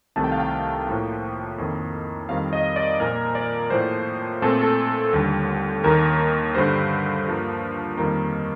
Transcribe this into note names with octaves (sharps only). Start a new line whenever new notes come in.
C2 C3 D#3 A3 A5
G5
F5
G5
A2 F3 A#3
F2 D#3 A#3
F2 D#3 G3 C4 F5
D#5
D5
A#2 F3 A#3 A#4
D5
A2 F3 A#3 C5
A#2 A3 C4 A4
A4
D#2 D3 G3
D#2 D#3 A#3 A#4
G2 D3 G3 C5
G2 F3 A#3
F2 D#3 G3 A#3